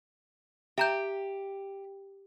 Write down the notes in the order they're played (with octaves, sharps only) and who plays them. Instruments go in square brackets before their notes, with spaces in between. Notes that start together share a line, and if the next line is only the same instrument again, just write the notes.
[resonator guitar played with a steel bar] G4 [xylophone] E5 A#5 G6